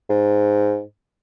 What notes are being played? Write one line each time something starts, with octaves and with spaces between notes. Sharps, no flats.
G#2